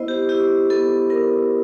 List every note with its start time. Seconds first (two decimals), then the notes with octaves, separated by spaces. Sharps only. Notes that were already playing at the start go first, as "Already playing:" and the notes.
Already playing: B3 E4 C5 D#5
0.08 G4
0.29 E4 G4
0.70 B3 A4
1.10 B3 A#4